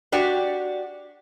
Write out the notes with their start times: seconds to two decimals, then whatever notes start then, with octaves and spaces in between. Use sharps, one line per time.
0.12 D4 F#4 G4 D5